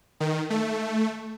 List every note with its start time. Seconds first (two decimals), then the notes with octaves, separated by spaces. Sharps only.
0.20 D#3
0.50 A3